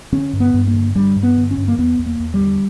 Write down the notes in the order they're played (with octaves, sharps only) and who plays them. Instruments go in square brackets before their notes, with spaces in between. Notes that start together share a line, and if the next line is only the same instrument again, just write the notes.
[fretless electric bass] D3 C#4
G2
B3
G2
A#3
D3
G2 G3
G2
B3
D3
C#4
G2
A#3
E2 B3
E2
A#3
E2
G3
D3